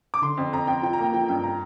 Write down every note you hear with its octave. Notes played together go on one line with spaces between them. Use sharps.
D6
D3 C6
F2
F2 A#5
F2 G5
F3 G5
A#5
A#3 G5
F3 G5
G2 G5
A#5